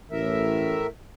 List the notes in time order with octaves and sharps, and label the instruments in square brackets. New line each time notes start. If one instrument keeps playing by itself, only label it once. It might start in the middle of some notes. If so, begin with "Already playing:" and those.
[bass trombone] A1 [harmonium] A2 A#4 E5